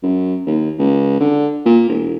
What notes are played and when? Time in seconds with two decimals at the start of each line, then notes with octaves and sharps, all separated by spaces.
0.03 F#2
0.46 D#2
0.78 C#2
1.20 D3
1.66 A#2
1.89 E1